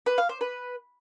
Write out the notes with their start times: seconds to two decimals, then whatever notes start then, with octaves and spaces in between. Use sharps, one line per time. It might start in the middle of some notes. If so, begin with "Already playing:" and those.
0.06 B4
0.18 F5
0.29 C5
0.41 B4